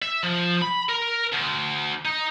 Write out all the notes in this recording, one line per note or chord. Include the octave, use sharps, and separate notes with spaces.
E5
F3
B5
A#4
D2
D#4